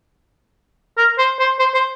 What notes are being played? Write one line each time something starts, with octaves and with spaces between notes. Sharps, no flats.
A#4
C5
C5
C5
C5